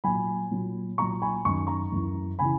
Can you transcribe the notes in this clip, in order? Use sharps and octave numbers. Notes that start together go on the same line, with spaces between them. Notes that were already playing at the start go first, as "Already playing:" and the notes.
A#2 F#3 G#5 B5
A#2 F#3
A#2 F#3 A#5 C#6
G#5 B5
F#2 D#3 F#3 C#6
A#5 C#6
F#2 E3
C#3 E3 G#5 B5